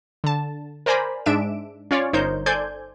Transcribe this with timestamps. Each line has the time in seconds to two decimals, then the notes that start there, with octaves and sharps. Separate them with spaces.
0.24 D3 A5
0.86 A#4 C5 D5 G#5 A#5 B5
1.26 G#2 G#3 D4 E5 D7 E7
1.91 C#4 F4 C#5 D5
2.13 G1 D#4 A#4 C5 C#5 G6
2.46 A4 C5 D5 G#5 G6 G#6